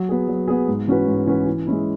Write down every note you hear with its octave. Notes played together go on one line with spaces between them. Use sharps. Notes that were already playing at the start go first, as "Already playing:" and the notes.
Already playing: F#3
B3 G#4
F#3
B3 G#4
G#2
E3 C#4 F#4 B4
G#2
E3 C#4 F#4 B4
E3
G#3 C#4 E4